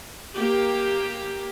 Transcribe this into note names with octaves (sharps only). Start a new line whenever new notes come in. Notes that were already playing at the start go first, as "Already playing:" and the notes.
A#3 G4